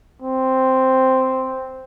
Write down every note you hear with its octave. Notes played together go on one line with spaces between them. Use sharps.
C4